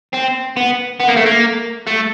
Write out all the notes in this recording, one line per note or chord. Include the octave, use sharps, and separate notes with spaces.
C4
B3
B3
A#3
A3
A#3
A3